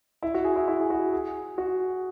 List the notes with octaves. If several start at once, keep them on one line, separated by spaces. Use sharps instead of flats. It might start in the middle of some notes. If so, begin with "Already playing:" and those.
E4
F#4
G#4
E4
E4
G#4
F#4
G#4
F#4